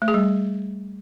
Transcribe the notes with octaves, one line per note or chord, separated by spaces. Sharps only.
A3
G#4
G3